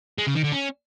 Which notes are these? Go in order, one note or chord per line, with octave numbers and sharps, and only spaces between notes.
G#3
C#3
D#3
D3
C#4